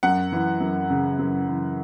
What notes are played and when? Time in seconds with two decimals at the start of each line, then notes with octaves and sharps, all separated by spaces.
0.03 F#2 F#5
0.32 E3
0.60 F#2
0.90 C#3
1.19 F#2
1.48 E3